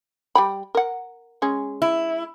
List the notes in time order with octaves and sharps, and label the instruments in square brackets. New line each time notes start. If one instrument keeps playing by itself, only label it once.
[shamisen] G3 G5 B5
A#4 F#5
G#3 C#4 G#4
[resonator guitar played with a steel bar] E4